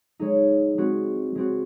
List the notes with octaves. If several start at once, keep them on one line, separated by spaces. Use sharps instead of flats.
G#3 D#4 G#4 C#5
G#3 C4 F#4
G#3 C4 F#4